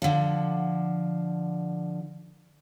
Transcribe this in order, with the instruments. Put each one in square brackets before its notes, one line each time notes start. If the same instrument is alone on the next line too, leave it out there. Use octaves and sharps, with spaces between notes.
[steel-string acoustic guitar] D3 F3